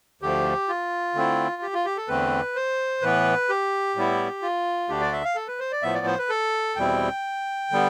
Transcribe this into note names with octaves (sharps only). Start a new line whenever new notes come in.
D2 D3 F3 A3 G4
F4
D3 A3 C4 E4
G4
F4
G4
A4
E2 D3 A3 C4 B4
C5
A2 E3 B3 B4
G4
A2 G3 B3 E4
F4
D2 D3 A3 D4 G4
D5
E5
F5
A4
B4
C5
D5
A2 F3 B3 E5
D5
C5
B4
A4
E2 B2 G3 C4 E4 G5
D3 G3 B3